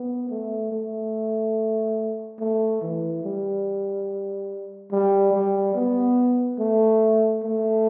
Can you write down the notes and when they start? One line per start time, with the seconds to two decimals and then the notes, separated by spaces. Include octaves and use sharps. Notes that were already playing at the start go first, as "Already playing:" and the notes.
Already playing: B3
0.30 A3
0.72 A3
2.39 A3
2.81 E3
3.24 G3
4.92 G3
5.33 G3
5.75 B3
6.59 A3
7.43 A3